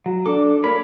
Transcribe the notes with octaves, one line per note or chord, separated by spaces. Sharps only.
F#3
D4 A4 D6
A#3 A#4 C#5 B5